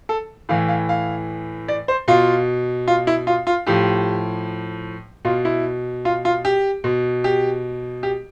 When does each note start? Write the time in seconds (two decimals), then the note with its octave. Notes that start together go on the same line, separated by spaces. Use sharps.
0.09 A4
0.49 A2 E3 F5
0.68 F5
0.89 F5
1.68 D5
1.88 C5
2.08 B2 F4
2.88 F4
3.07 E4
3.27 F4
3.47 F4
3.67 A2 F3 G4
5.25 B2 F4
5.45 E4
6.05 F4
6.25 F4
6.45 G4
6.84 B2
7.24 G4
8.03 G4